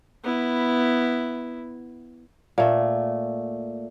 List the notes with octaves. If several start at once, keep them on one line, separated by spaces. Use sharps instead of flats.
B3 E4
A#2 A3